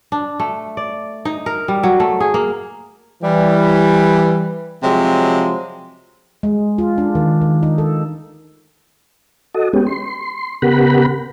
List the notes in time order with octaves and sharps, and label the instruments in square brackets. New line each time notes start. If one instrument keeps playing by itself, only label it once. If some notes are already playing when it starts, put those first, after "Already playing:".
[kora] D4
A3
D5
D#4
A#4
G3
F#3
A3
G#4
A#3
[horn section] E3 G3
C3 F3 F#3 G#3
[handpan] G#3
F4
D4
D#3
D#3
D#4
A4
[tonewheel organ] F#4 A4 D#5
G#3 B3 C#4 G4
C6
C#3 B3 G4 A#4 F#5 B5